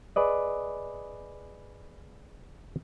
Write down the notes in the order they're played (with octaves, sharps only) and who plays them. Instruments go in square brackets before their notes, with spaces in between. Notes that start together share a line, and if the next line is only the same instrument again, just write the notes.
[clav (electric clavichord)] G#4 B4 D5 D#5